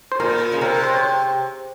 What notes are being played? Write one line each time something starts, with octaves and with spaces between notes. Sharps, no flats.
C5
A#2 A#4
C#3
C3 A#4
C5
C#5